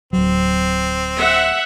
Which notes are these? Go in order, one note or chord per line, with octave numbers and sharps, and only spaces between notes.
D1 F#3 C4
E5 F#5